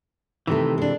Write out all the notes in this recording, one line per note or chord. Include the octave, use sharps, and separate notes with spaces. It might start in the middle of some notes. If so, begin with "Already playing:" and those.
C3 D#3 E3 A3
G#3 D4